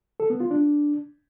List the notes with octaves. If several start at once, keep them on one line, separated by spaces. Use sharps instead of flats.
A4
B3
F4
D4